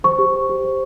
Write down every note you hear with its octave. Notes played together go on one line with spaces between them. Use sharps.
C5 C#6
G4
C5
G4
C5